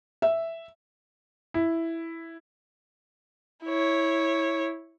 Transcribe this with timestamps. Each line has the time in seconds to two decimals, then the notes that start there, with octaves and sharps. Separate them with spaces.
0.22 E5
1.54 E4
3.65 E4 C#5